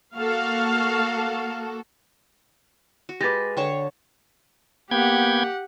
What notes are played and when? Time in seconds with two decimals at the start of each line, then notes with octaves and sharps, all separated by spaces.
0.16 A#3 F#4 A4 F5
3.09 F#4
3.21 G#3 G4 B4 D6 A6 A#6
3.57 D3 C#5 G5 A5
4.91 A#3 B3 G4 F#5 G5 G#6